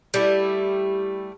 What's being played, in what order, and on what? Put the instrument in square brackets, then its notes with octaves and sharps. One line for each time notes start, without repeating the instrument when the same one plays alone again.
[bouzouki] G3 A3 E4